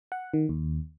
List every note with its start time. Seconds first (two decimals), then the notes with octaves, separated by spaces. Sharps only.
0.12 F#5
0.34 D#3
0.49 D#2